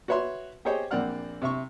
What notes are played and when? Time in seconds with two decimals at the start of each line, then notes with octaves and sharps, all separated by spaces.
0.08 F#4 B4 C#5 E5 C6
0.65 G4 G#4 C5 C#5 D#5 G5
0.91 A#1 A#3 C4 D5 F#5 F6
1.42 C3 E5 C#6